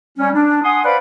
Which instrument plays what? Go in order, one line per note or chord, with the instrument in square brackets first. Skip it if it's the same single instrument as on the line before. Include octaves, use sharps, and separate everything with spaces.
[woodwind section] G3 C#4
D4
F#5 G#5 C6 D#6
B4 C5 D5 F5 F#5 B5